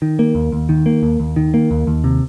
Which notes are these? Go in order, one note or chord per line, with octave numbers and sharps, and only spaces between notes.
D#3
A#3
D#2
D#2
D#3
A#3
D#2
D#2
D#3
A#3
D#2
D#2
C3